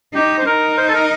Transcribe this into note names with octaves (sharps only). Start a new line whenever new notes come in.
D#4 G4
C5
D#4 A#4
C5
A4
A#4